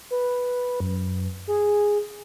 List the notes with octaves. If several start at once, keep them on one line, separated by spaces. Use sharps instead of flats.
B4
F#2
G#4